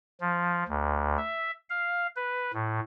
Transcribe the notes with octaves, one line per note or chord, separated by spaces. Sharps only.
F3
D2
E5
F5
B4
A2